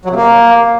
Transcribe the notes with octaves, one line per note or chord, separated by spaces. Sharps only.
F#3
C3
A#3